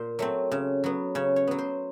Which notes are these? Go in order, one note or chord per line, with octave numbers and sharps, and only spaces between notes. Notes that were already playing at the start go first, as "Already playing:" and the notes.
Already playing: A#2 C5
F#3 A3 C4
C#3
F#3 B3
C#3 C#5
C#5
F#3 B3
C5